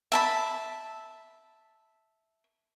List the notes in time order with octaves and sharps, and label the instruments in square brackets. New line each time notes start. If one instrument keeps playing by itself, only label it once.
[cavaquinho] E5 A5 B5